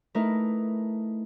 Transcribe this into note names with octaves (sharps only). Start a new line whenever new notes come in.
A3 D#4 E4 A#4 B4